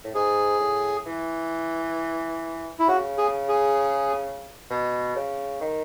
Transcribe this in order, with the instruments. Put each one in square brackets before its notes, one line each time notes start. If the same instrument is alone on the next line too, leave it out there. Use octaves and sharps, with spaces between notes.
[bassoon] A2
[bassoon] G#2 [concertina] G#4
[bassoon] A2
E3
[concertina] E4
[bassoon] C#3 [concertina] F#4
[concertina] G#4
G#4
[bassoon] B2
C#3
D#3